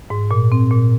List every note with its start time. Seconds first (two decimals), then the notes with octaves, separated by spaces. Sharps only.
0.10 G#2
0.31 A#2
0.52 C4
0.71 A#2